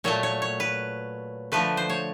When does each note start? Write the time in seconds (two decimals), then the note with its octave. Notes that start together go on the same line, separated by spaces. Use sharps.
0.04 A#2 F#3 A3 C#5
0.23 C#5
0.42 C#5
0.60 B4
1.52 D3 F3 A3 B4
1.77 C5
1.89 C#5